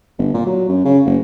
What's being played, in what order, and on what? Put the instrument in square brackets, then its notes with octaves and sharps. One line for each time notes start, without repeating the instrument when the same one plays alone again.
[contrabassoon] G1
A#2
F#3
F#2
C#3
F#1